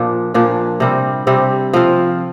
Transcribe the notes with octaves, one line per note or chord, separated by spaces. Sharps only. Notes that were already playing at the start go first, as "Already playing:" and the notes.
Already playing: A#2 F3 D4
A#2 F3 D4
C3 G3 C4
C3 G3 C4
F3 C4 F4